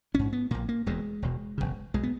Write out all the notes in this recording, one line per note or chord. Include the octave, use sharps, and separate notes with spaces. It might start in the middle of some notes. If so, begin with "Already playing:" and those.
A#1 G#2 C#4
B3
A#1 A#2 A#3
A#3
E1 E2 B2 G#3
E1 E2 B2
E1 D#2 C#3
B1 B2 G#3
B3